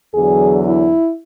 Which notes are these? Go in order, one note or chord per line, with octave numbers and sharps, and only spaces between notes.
E2 D3 F#3 G#4
E4